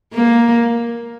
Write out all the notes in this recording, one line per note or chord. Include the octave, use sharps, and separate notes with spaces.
A#3